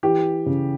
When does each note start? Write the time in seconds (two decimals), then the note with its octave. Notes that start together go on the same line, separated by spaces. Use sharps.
0.03 E3 G4
0.46 C#3